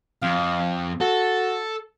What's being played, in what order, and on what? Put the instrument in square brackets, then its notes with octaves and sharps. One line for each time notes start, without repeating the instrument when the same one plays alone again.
[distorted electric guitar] F2 [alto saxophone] F5
[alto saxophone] F#4 [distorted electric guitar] A4